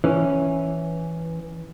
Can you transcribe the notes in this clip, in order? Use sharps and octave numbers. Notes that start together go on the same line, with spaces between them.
E3 C#4